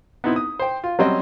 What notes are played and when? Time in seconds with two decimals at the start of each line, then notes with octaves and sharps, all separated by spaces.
0.24 B3 C4 D#4 E4
0.36 D#6
0.59 C5 G5
0.84 F4
0.99 F#3 G3 C4 C#4 D#5